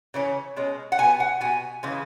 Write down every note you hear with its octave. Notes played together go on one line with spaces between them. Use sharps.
C#3 E3 C#4
B2 G#3 C#4
F#5
B2 B3 G#5
F#5
B2 B3 G#5
C#3 E3 G#3